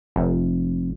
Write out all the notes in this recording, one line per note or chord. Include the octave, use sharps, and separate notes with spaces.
F1